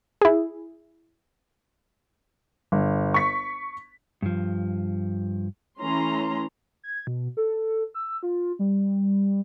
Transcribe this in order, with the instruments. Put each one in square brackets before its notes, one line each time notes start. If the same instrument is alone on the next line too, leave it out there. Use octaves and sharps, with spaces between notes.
[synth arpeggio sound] E4 G#4
[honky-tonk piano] G1
C#6 B6
[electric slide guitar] G2 F3
[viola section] E3 A3 C#4 A#5 C6
[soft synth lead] G#6
B2
A4
E6
F4
G3